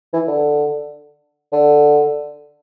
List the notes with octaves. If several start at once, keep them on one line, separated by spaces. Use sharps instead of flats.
E3
D3
D3